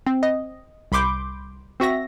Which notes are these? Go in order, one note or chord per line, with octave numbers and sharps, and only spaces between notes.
C4
D#5
C2 B5 C6 D6 G6
C4 F#4 E5 A#6